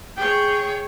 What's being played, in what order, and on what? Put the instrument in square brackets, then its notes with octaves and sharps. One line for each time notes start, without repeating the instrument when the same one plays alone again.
[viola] G#4 C#5 [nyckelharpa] G5